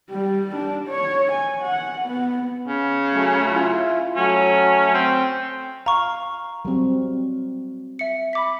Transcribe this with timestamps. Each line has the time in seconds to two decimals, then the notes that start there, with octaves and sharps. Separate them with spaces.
0.10 G3
0.56 D4
0.88 C#5
1.32 G#5
1.62 F#5
2.05 B3
2.68 C#3
3.13 F#3 A3
3.52 E4 F4
4.16 F#3 A3 C#4 F#4
4.94 C4
5.86 F5 A#5 C#6
6.65 F#3 G3 C4
7.99 E5 C#7
8.33 B5 D6 B6